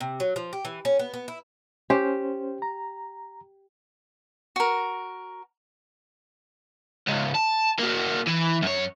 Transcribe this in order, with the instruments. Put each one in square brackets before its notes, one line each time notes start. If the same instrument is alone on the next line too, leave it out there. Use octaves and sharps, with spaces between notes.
[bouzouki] C3
F#3
F3
G4
E3
C#4
B3
B3
E4
[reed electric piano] C#4 C5 [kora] G4
[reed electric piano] A#5
[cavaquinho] F#4 A#4
[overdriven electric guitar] C#2 G#2
A5
A#3 F#4
E3
F#2 C#5